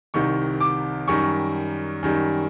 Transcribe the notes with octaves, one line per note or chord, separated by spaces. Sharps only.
C2 C3 D#3 C#6
D6
F#2 D#3 G3 C#6
F#2 D#3 G3